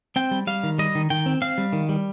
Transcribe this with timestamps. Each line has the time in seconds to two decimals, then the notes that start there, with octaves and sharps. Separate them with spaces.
0.16 C4 G5
0.31 G3
0.47 G3 F5
0.63 D#3
0.78 G3 D#5
0.95 D#3
1.10 D#3 G5
1.26 C4
1.42 C4 F5
1.58 G3
1.73 D#3
1.89 G3